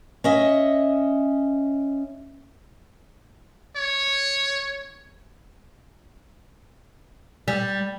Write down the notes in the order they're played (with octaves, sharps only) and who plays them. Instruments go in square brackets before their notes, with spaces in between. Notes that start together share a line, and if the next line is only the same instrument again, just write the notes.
[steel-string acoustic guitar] C#4 D#5 E5
[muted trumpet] C#5
[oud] G3